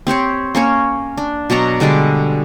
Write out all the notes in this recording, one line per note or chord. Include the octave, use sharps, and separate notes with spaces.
C4 G4 C5 C#5
A#3 C#4 C#5
D4
B2 F#3 D5 A#5
D3 G3 G#3 D5